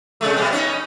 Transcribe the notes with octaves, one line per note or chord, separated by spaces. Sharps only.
C3 G#3 A3
B2 G3 B3
B3 C#4 D#4